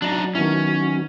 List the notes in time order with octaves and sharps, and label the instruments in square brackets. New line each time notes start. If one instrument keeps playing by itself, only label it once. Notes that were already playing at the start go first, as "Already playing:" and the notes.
[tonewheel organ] F#3 [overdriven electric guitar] D4 D#4
[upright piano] D#3 B3 E4 [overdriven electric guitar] C#4